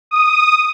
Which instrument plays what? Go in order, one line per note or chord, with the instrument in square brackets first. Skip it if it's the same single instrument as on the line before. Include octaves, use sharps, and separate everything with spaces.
[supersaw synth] D#6